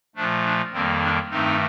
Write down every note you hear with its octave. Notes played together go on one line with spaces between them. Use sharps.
A#2 F3 A3 D4
D4
F2 D#3 G3 A#3 C4
D4
G2 D#3 A3 C4 D#4